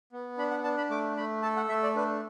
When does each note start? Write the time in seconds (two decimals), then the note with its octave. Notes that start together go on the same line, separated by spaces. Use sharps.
0.13 B3
0.38 D4 B5
0.51 F#5
0.64 D4 A5
0.78 B5
0.90 A3 D6
1.17 A3 B5
1.42 A4 A5
1.56 F#5
1.69 A3 E5
1.83 D5
1.96 D4 B4